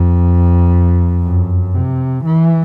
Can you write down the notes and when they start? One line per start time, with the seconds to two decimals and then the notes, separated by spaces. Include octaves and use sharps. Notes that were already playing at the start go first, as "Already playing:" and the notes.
Already playing: F2
1.24 F#2
1.74 C3
2.24 E3